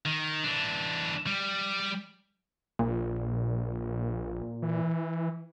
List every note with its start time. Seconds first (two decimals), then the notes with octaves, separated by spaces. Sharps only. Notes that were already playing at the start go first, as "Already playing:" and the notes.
0.05 D#3
0.44 E3 D4
1.27 G3
2.79 A#1 A#2
4.62 E3